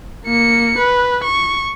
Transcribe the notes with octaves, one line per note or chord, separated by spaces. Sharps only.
A#3 C#7
B4
C#6